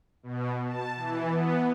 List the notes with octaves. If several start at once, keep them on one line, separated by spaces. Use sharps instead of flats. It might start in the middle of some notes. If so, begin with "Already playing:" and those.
B2
A5
E3
B3